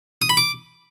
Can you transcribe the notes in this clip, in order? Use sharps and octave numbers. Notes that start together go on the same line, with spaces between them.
D#6
B5
D6